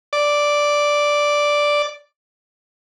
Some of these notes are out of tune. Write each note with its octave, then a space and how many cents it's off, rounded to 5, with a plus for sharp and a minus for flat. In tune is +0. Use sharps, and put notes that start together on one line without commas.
D5 +0